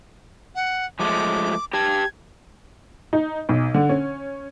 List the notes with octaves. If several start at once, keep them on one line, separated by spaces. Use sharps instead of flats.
F#5
F3 G#3 A3 D6
G4 G5 A5 G#6
D#4
B1
D3
C#4